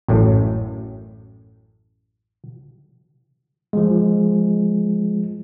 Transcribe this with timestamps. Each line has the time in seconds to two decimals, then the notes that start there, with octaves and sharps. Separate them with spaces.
0.08 A1 F#2 A2
3.73 F3 G#3